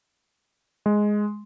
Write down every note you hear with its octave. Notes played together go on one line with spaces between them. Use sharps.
G#3